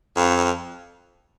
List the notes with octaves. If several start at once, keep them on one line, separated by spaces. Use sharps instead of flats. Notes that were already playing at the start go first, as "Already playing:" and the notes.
F2